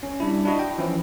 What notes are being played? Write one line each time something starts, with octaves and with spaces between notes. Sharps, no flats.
C#4
G3 D4 E4
D4 E4 F#4 D#5
G5
E3 F3 C#4 E4